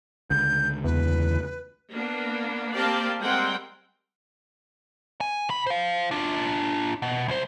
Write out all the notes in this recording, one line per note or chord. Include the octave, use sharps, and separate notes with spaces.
C#2 D3 G6
E2 B4
A#3 B3 D4
A#3 C4 G4 D5 F5 A5
G3 G#3 C4 A#4 F#5 G5
G#5
C3 B5
C5 F5
D4 F4
B2
C2 C5